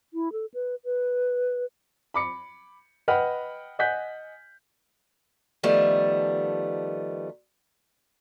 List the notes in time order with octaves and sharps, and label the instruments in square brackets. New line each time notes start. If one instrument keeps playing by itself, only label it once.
[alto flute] E4
A4
B4
B4
[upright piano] B5 D6 C#7
B4 D#5 F#5 G5 B5 F6
D#5 F#5 G#5 F#6 G6 B6
[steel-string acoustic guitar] D#3 F3 G3 A3 B3